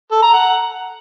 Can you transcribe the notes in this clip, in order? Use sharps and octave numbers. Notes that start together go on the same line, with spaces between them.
A4
A#5
F#5